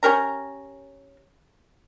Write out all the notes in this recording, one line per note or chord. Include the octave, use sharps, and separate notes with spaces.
C#4 G4 A#4 A#5